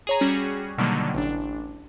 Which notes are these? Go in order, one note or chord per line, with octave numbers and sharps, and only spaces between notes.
G#4 C#5 A#5
G3 C#4 F#4 G#4
B2 D3 D#3 F#3 G3 A#3
A1 D4